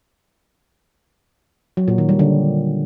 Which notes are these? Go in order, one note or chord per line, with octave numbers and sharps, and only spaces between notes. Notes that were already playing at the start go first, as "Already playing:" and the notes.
F#3
A#2
D#3
G3
D3